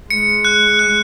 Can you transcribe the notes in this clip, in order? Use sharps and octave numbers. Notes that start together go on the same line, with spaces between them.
G#3 C#7
F#6
F#6